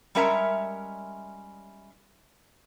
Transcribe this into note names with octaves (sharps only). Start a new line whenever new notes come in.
G3 G#3 C#4 A#4 E5 A#5